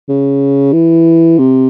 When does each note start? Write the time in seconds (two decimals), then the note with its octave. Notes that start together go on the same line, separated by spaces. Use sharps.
0.09 C#3
0.73 E3
1.39 C3